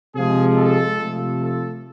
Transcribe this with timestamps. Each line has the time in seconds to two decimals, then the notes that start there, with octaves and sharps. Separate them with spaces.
0.15 C3 F3 G#3 G#4
0.57 A4
0.99 C3 F3 A3
1.42 A4